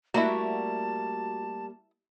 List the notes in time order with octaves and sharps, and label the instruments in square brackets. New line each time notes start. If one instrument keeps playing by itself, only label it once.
[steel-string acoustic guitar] G3 A3 A#3 [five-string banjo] E4 D5 A#5 [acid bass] F#4 [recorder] A5